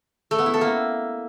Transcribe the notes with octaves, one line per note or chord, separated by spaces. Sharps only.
A3
B3
E4
A4
A#3